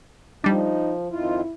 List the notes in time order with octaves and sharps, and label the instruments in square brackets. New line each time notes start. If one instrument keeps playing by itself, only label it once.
[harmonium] F3 [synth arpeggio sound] G3 D4 [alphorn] D#4
[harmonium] F2 D#3 F4 [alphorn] E4